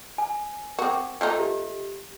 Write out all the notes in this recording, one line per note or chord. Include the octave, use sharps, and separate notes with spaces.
G#5
C4 F#4 A#4 D6
F3 A3 D#4
G4